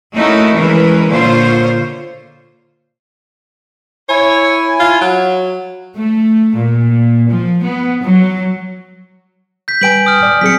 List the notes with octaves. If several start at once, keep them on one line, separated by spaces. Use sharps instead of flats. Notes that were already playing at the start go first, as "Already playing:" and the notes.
A3 C#4 D#4 E4 F#4 A#4
E3 G#3 C#4 A#4 B4
A#2 D3 F4 C5 C#5
E4 C#5 G#5
F4
F#3
A3
A#2
F3
B3
F#3
G6 B6
G3 B4 G5 G#5 D7 F#7
D#6 F6
D5
F#3 C4 G#4 B6 C#7